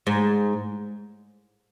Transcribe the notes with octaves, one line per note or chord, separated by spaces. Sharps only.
G#2